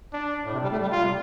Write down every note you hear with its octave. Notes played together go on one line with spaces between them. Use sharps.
D4
A2
C3
G3
A3
G3
F4
C3